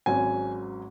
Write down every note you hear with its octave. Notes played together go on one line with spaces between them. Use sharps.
G#1 G#2 F#3 C#4 G#5